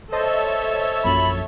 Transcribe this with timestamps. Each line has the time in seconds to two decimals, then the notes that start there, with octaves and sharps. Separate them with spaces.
0.12 A4 C5 C#5 D#5 E5 A5
1.04 A#1 F#2 B5